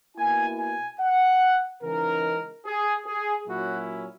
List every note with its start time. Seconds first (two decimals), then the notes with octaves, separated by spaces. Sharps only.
0.17 B2 A#3 E4 G#5
0.58 G#5
1.00 F#5
1.82 C#3 E3 G#3 D#4 A#4
2.66 G#4
3.06 G#4
3.48 A#2 F#3 C#4 E4 F#4